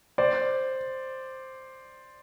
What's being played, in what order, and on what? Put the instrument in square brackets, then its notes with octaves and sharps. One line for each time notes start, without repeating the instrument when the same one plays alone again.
[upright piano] C5 D5